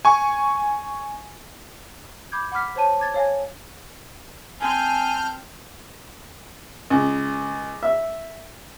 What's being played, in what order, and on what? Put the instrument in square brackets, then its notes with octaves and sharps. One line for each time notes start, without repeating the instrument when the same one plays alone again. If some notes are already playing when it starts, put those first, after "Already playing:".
[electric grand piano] G#5 C#6
[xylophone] B5 D6 G6 G#6
F#5 B5 D6 F6 B6
C5 C#5 A5 D#7
D6 G#6 A6
C#5 F5 G#5 A#6
[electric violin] C4 [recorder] G#5 [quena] A5 [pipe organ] F6 G6
[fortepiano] C#2
E5